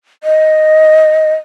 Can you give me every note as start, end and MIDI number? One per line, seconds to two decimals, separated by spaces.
0.24 1.34 75